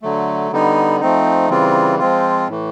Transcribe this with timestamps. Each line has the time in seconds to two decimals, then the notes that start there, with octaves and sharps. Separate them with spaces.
0.02 D3 F#3 A3
0.52 D3 G3 B3 D#4
1.01 F3 A3 C4 D#4
1.50 C#3 E3 G3 C4 F4
1.99 F3 G#3 C4 F4
2.48 A2 E3 A3